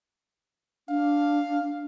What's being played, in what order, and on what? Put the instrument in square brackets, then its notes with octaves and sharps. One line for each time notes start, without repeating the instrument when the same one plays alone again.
[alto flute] D4 [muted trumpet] F5